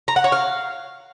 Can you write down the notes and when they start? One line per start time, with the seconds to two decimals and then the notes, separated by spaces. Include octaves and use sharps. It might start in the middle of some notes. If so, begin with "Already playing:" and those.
0.08 A#5
0.16 F#5
0.24 C#5
0.32 F5